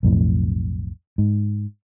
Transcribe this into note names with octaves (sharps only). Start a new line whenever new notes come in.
B1 F2 A2
G#2